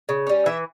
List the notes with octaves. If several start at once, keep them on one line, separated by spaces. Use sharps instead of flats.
C#3
G3 C#4
E3 E5